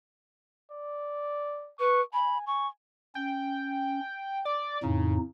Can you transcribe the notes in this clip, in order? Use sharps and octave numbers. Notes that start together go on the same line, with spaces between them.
D5
B4 C#6
G#5 B5
G#5 C#6
C#4 G5
D5 D6
F2 A2 C#3 D#4